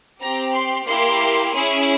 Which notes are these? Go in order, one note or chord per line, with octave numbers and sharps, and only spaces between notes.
C4 G4 A#5
C6
A#3 E4 G4 C6
C#4 E4 G#4